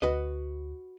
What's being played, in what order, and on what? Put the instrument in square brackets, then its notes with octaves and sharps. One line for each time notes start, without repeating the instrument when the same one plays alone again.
[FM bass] D2 [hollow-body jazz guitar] F#4 B4 D#5